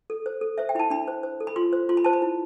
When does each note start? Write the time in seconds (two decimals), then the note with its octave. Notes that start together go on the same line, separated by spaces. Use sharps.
0.10 A4
0.26 C5
0.41 A4
0.58 C5 E5
0.69 G5
0.75 E4 B5
0.79 A5
0.90 D4 B5
1.08 C5
1.23 C5
1.40 A4
1.47 B5
1.56 F4 C6
1.73 C5
1.89 F4 C6
1.97 B5
2.04 C5 A5
2.13 B5
2.22 E4